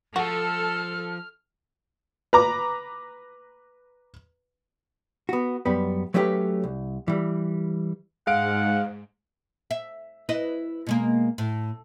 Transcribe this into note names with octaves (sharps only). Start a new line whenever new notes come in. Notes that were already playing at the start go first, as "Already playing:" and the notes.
F3 F#4 A4 F6
B4 A#5 D6
B3 F#4
F#2 G3 B3
F#3 A3 C#4 E4 G4 B4
C2
E3 G3
G#2 G#3 F5 F#5 D7
E5
E4 B4 D#5
B2 G#3 A#3
A2